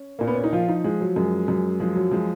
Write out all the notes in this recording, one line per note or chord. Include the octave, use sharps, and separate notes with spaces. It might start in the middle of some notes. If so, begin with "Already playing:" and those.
Already playing: C#4
A#2 A#3
B3
C#4
D#4
F3 F4
D#4
F3 G#3
F#3
F#2 G#3
F#2
F3 G#3
F#3
F3 G#3